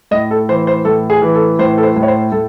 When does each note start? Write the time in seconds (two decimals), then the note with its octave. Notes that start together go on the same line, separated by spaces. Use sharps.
0.11 A2 D#5
0.31 A4
0.49 E3 C5
0.67 C5
0.85 A2 A4
1.10 G#4
1.22 E3
1.35 A4
1.59 A2 C5
1.78 A4
1.83 C5
1.96 A2
2.03 C#5
2.08 C5
2.32 A2 A4